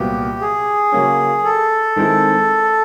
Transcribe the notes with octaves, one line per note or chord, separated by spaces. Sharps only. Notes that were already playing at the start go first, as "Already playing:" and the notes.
Already playing: C2 A#2 F#3 B3 G4
G#4
C#3 F#3 A#3 C#4
A4
D#3 G#3 C4 E4